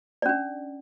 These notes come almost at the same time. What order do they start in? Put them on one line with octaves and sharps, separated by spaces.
D5 C#4 D4